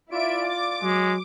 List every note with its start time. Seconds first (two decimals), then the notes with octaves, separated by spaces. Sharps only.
0.10 E4 F4 D5 E5 D7
0.47 D6
0.83 F#3 G#3